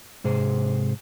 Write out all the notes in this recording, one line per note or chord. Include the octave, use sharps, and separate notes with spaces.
G#2 C3 G#4 C5